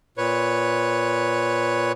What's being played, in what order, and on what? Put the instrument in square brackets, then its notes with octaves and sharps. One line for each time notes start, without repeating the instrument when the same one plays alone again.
[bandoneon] A#2 B4 C#5